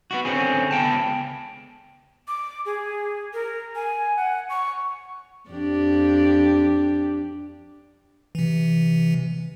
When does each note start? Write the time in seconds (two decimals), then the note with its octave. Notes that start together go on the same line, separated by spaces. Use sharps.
0.11 B3 E4 F#4
0.25 D3 C4 C#4 G#4
0.71 C#2 B3 G5 A5
2.28 D6
2.66 G#4
3.34 A#4
3.75 G#5
4.17 F#5
4.49 C#6
5.49 F2 D4 G4
8.35 C3 E3